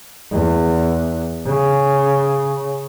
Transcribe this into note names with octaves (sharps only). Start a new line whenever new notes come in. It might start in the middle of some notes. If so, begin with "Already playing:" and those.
E2
C#3